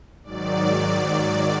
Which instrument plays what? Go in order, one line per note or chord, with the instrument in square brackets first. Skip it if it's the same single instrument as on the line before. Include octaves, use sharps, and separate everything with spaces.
[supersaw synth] G#2 D#3 F#3 D5